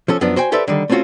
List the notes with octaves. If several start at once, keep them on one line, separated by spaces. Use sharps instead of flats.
F3 C#4 A4
F#2 F3 B3 D4
F#4 C5 G5 G#5
G4 A4 B4 C5 D5 E5
D3 D#3 G3
A3 C4 C#4 F4 F#4